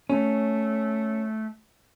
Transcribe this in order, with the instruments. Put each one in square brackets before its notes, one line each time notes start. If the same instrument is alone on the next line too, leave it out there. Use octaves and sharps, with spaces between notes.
[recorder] A3 [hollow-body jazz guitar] C#4